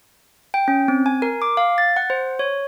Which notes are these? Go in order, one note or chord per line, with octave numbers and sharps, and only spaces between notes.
G5
C#4
C4
G#5
A#4
D6
F5
A6
F#5
C5
C#5